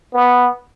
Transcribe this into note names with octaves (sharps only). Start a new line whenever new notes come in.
B3